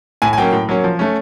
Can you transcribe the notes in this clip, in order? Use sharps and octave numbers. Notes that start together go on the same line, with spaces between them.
A2 G#5
G#5
F#3 A#3 C#4 G5
A2
F#3 A#3 C#4
F3
A3 C#4